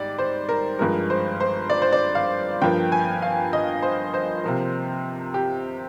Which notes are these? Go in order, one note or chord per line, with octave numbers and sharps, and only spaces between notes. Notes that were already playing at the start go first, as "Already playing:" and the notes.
Already playing: G#2 G3 D5
C5
A#4
G2 F3 G#3 A#4
C5
C5
D5
C5
D5
F5
G2 F3 A#3 G5
G#5
F5
D#5
C5
C5
C3 F3 A#3
G4